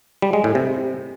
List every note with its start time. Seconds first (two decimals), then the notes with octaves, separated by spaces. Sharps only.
0.22 G3
0.33 G#3
0.44 A2
0.55 C3